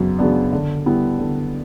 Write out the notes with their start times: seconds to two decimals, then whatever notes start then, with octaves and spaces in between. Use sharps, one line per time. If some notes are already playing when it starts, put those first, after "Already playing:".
Already playing: F#2 C#3 B3
0.19 C#3 F#3 B3 D4
0.52 D3
0.86 G3 B3 E4
1.19 D3